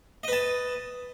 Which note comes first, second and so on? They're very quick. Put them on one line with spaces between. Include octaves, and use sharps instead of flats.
D#5 B4 A5